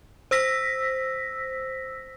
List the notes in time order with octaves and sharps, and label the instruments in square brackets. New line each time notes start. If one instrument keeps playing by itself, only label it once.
[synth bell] C5 E6 A#6 B6